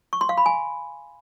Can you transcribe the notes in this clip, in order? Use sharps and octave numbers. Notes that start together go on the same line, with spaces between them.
C#6
C6
F5
B5
G#5